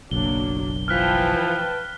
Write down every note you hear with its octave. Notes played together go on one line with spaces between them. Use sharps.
F#1 B1 F#3 A#3 D4 G7
E3 F3 B4 G5 A5 F6 F#6 B6